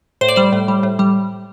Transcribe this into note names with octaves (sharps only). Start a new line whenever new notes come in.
A2 C5
D5
G3 C5
A2
G3
A2
G3